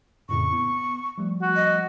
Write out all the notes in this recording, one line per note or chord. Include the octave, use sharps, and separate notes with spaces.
F2 A2 C#3 C#6
B3
F3 G3 A3
F#4
D#5